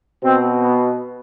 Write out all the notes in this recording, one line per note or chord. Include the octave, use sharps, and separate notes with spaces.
B2 C4
B3